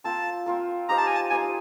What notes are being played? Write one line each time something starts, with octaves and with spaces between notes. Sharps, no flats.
C4 F4 A#4 A5
C4 F4 A#4
D#4 G4 C5 F5 A#5
A5
G#5
A5
D#4 G4 C5 F5 G#5